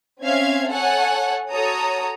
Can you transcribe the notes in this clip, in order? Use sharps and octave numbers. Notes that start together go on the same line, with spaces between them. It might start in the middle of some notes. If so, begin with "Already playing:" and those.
C4 C#4 E5 F5 G#6
A4 C#5 F#5 G#5
F#4 A4 C#5 A#5 D#6